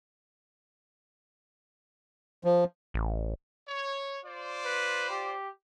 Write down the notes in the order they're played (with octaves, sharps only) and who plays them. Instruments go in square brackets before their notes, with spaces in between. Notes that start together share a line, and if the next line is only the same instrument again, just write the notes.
[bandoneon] F3
[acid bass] A1
[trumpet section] C#5
F4 C5 D5
[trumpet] B4
G4